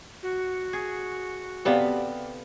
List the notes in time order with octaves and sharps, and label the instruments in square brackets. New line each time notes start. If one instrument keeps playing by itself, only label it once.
[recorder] F#4
[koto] G#4
[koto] C3 B3 A4 [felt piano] G4 D5 F5